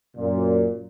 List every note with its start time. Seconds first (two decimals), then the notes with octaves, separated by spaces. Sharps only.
0.17 F#2 A#2